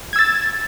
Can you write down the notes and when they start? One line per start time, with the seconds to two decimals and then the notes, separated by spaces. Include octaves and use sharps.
0.13 G#6
0.16 E6
0.19 A6